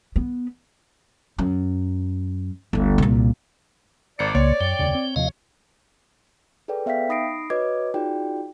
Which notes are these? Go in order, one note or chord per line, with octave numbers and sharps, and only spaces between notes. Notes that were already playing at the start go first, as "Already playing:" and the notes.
B3
F#2
G1 D2
C2 A#2
G#1 D5 C#7
C2 C#3 A#3 C#5
F#2 G5
F1 D#2 C#3
C4
D#2 C3 F3 D#5 F5
G#4 A4 B4 D5 G5
B3 E5 F5 G5 B6
D#4 B5 D#6 A#6 C7 D7
F#4 B4 C#5 D#5 D6 G#6
D#4 F4 F#4 G#4 D5 G5